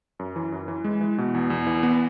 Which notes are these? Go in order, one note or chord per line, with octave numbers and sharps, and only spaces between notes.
F#2
E3
F#2
E3
G#3
E3
B2
E2
E2
E3
B3